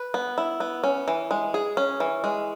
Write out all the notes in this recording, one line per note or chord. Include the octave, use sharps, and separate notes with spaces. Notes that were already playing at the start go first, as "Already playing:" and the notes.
Already playing: B4
B3
E4
B3
C#4
E3
G#3
G#4
C#4
E3
G#3